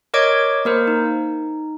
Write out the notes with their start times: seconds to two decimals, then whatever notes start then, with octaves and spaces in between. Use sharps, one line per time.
0.14 A#4 C#5 D#5 D6 G#6 D7
0.65 A#3 A#4 C5
0.87 D#4